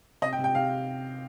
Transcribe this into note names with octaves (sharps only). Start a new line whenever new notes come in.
C3 D#5
G5
C3
G5
C3 F5